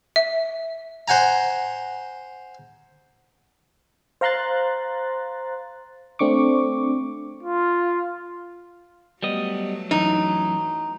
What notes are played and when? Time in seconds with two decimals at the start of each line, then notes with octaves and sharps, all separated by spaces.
0.16 E5
1.08 C5 F#5 G#5 A#5
4.21 C5 F5 A#5 C6 F#6 A6
6.19 A3 C4 D4 C#6 D6
7.43 F4
9.23 F#3 G3 A3 B3 D#5
9.91 F#2 E3 D#4